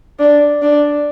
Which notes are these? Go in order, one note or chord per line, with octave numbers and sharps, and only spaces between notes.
D4
D4